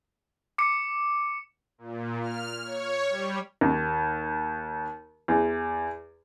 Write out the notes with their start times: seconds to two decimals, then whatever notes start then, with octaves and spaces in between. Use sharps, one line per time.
0.58 D6 C#7
1.78 A#2
2.21 F6
2.63 C#5
3.09 G3
3.61 D#2
5.28 E2